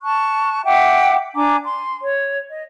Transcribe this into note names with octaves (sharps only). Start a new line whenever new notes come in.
A5 C#6 F#6
E5 F#5 G5 D6
D4 G#5 A#5 D6
C6
C#5
D#5